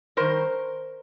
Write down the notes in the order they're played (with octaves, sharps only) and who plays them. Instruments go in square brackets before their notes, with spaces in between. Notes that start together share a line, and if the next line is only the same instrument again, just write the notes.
[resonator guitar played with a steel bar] G2 D#3 A#4 C5